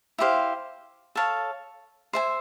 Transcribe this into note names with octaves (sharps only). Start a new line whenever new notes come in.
E4 G4 C5 F5
A4 C#5 F5 A5
C5 E5 G#5